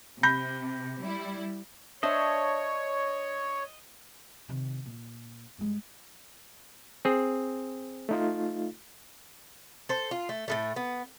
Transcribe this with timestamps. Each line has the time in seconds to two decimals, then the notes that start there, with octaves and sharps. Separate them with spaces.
0.23 C3 B5 G6 A#6
1.03 G3 E4
2.03 D4 C5 C#5 D#5 E5
4.48 C3 D#3
4.86 A#2
5.58 G2 G#3
7.05 C4 G#4
8.09 A3 D#4 F4
9.89 A4 C5
10.11 F4
10.29 A3
10.48 A2 C#3 A3
10.76 B3